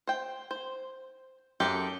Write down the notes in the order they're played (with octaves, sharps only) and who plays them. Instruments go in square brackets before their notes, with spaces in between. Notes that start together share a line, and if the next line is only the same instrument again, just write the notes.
[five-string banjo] C5 G5
C5
[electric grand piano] F#2 [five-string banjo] G4 A4